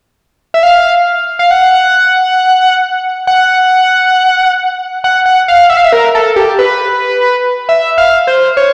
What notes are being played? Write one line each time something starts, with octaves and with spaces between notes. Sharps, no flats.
E5
F5
F5
F#5
F#5
F#5
F#5
F5
E5
F5
E5
A#4
A4
G4
B4
E5
F5
C5
C#5